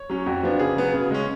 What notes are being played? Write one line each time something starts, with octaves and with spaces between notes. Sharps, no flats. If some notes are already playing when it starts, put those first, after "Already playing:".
Already playing: C#5
F#3 C#4
F2 F#4
F3 B3 D4
C#3 G#4
F#3 B3
C#3
G#3 C#4